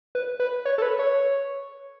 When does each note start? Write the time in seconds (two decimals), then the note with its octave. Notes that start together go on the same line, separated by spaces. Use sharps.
0.15 B4
0.40 B4
0.65 C#5
0.78 A4
0.82 B4
0.99 C#5